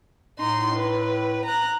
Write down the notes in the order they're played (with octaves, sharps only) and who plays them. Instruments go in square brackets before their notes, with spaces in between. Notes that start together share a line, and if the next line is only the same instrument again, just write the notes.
[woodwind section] A2 [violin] D#4 C6
[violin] B4
A#5 F#6